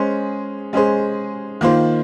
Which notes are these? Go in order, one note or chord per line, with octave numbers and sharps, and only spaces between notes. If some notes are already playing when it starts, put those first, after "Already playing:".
Already playing: G#3 C#4 G#4 C5
G#3 C#4 G#4 C5
D#3 A#3 F4 C5